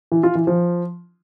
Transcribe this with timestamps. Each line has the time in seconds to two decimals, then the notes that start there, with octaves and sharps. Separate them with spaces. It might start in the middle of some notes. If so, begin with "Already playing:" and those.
0.12 E3
0.23 F4
0.35 E3
0.47 F3